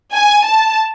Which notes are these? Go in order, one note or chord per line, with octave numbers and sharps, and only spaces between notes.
G#5
A5